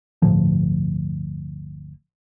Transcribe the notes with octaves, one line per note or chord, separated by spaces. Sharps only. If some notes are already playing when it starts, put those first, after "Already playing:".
G1 D2 A2 F3